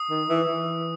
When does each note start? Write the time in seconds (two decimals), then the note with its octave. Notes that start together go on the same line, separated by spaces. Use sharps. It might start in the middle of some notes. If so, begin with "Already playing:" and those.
Already playing: D#6
0.10 D#3
0.29 E3
0.48 E3